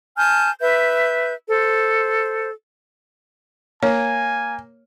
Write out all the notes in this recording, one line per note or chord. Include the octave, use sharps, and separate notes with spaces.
G#5 A5 F6 G6
B4 E5 G6
A4 C5
A#3 C#5 G#5